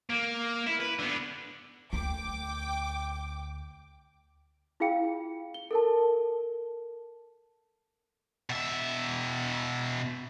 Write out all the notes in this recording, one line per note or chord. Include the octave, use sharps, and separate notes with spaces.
A#3
E4
B4
D3 B3
D2 G5 D6
E4 F4 G#4 F5 G5 C#7
G7
A4 A#4 A5
B2 E5